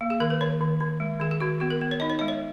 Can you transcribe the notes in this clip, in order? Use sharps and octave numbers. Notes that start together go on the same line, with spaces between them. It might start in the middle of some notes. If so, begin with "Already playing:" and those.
A#3
G#4
D#3 A#4
B4
D#3 C#5
D#3
D#3
G#3
D#3 G#4
G#4
D#3 F#4
B3 F#4
A#4
B3
C#5
D#4 D#5
C#5
G#3 D#5
C#5